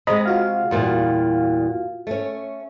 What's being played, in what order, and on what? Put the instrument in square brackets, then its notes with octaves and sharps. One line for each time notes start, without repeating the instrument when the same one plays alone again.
[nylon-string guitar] C3 G#3 [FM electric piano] D#5 A#5 B5
[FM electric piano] F4 F#4 F5
[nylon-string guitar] E2 A#2 G3
A3 C#4